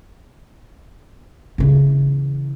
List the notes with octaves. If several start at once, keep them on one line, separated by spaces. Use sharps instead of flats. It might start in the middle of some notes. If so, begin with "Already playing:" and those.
C#3 E3